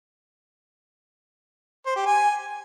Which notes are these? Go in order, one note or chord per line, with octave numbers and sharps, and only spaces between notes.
C5
G4
G#5